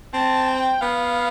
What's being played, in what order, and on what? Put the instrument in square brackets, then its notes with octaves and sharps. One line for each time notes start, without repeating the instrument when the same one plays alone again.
[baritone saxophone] C4 [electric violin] A5
[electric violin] G5
[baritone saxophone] B3 [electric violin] F5